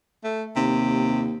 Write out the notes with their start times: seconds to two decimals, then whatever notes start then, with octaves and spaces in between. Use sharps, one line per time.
0.24 A3
0.56 D#2 C3